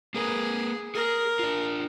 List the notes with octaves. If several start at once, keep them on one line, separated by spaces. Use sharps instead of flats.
A#3 G#4 A#4 B4
G#4 A#4
D4 F4